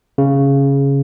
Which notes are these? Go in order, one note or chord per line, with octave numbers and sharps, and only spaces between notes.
C#3